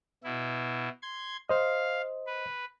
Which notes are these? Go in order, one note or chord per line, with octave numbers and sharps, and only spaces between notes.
B2 E4
C6 G#6
C5 D#5 F5
B4